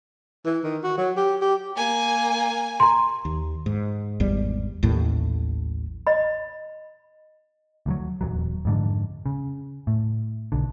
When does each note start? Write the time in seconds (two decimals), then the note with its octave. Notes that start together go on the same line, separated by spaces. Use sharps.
0.46 E3
0.64 D#3
0.84 F#4
0.98 F#3
1.17 G4
1.42 G4
1.76 A#3 G#5
2.80 A#5 C6
3.25 D#2
3.66 G#2
4.20 G#1 E2 G3
4.83 A1 D#2 A2 F#3
6.07 D#5 B5
7.86 D2 F3 F#3
8.21 D#1 E2 F#3
8.65 F2 G#2 D3
9.26 C#3
9.87 A2
10.52 B1 D3